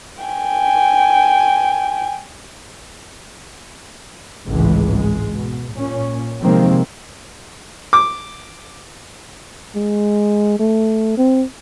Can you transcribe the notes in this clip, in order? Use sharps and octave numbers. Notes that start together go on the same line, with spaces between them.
G5 G#5
G#1 C#2 A2 E3 G#3
G#3
B2
A#2 C#4
C3 D#3 F3 G#3 A#3 C4
D6
G#3
A3
C4